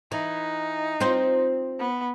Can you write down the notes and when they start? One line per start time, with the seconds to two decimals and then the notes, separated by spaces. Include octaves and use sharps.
0.12 E3 D#4
1.01 C4 F4 C5
1.79 B3